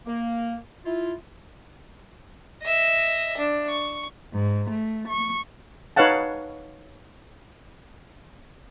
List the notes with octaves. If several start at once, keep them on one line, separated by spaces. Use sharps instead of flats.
A#3
E4 F4
D#5 E5
D4
C#6
G#2
A3
C#6
D#4 B4 C#5 F5 F#5 A5